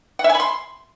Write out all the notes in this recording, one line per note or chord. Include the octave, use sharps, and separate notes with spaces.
F#5
E5
G#5
B5
C6